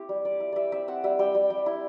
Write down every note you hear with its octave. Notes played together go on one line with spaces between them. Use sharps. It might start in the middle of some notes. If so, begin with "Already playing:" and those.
Already playing: C4 E4 G4
G3
G3 D5
E4
G3 D5 E5
C4 E5
C4 F#5
G3 E5
G3 G5
G3
G3
E4